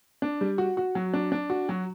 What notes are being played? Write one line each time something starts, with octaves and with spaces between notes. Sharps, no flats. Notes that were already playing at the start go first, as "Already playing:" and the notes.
D4
G3
F#4
F#4
F#3
D4
D4
F#4
F#3